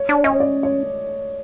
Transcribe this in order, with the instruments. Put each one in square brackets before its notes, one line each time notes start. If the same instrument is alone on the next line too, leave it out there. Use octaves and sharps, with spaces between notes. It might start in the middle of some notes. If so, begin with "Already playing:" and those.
Already playing: [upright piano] C#5
[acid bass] D4
[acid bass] C#4 [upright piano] D#5
[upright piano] D5
C#5